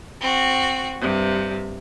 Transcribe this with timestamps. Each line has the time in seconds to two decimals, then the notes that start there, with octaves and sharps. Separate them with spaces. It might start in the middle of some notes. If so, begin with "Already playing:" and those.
0.20 C4 F#4
1.00 G2 C3